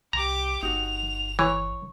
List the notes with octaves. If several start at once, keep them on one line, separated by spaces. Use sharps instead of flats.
C2 G4 A#5 D6
G1 D#4 F#4 F7
E3 C#5